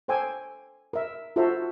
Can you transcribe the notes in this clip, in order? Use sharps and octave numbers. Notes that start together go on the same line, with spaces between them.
A4 C5 G5 G#5 D6 E6
A#4 E5
F4 F#4 A4 C5 E5 A#5